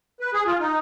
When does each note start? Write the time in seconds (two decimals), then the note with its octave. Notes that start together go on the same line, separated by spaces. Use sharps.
0.20 B4
0.33 G#4
0.47 F4
0.60 D#4